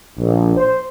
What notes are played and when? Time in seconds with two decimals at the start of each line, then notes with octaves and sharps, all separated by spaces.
0.19 A#1
0.56 C5